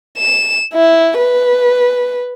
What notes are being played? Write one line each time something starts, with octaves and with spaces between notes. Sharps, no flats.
E7
E4
B4